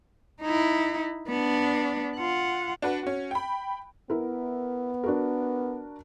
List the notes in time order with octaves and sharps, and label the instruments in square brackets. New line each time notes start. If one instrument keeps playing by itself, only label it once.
[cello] D#4 E4
B3 D4
F4 F#5
[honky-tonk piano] D4 F#4 B4 F#5
C#4 F#4
G5 B5
[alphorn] B3 [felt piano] E4 A#4
[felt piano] D4 F#4 A#4